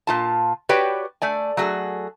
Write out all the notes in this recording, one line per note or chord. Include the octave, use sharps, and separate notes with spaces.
A#2 F4 A5
F#4 G4 B4 C#5 D5 G5
A3 D5 G#5
F#3 A3 F#4 G#4